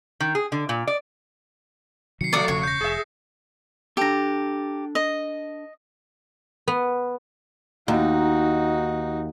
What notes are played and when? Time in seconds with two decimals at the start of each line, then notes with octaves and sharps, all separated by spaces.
0.20 D#3
0.35 G#4
0.52 D3
0.69 A#2
0.87 D5
2.21 C3 D#3 F#3 C7 C#7
2.33 F3 A3 D5 D#6
2.48 E1 C#3 C#4 C#5
2.63 G6 A#6
2.81 F1 G#4 E5
3.97 D4 G4 A4 A#5
4.95 D#5
6.68 B3
7.88 D#2 D#4 F#4